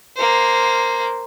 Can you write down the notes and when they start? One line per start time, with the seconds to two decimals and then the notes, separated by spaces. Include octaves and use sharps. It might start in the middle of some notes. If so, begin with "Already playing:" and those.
0.16 A#3 C5